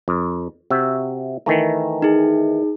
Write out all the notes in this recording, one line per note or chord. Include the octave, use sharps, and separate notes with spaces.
F2
C3 F#4 E5
D#3 E3 A3 A#5
D#4 G#4